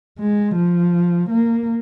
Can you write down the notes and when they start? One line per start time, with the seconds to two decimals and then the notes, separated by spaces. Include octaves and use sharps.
0.19 G#3
0.56 F3
1.30 A#3